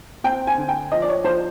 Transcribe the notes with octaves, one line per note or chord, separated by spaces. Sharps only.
C4 G5
G#5
D3
G5
F3 D#5
D5
C#5
F3 C5